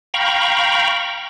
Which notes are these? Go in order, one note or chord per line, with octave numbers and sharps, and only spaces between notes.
F5 G5 A#5 B5 C#6